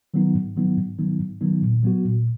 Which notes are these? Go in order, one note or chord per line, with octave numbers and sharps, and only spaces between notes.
D#3 F#3 B3 D#4
G#2
D#3 F#3 B3 D#4
G#2
D#3 F#3 B3 D#4
G#2
D#3 F#3 B3 D#4
A#2
F#3 B3 F#4
A#2